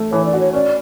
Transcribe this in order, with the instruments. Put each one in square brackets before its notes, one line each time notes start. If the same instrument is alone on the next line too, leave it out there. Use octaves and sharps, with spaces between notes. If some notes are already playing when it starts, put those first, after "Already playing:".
Already playing: [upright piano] A3
[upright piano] E3 [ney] C#5
[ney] D5
[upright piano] F#4
[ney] C#5
[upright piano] C#4 [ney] D5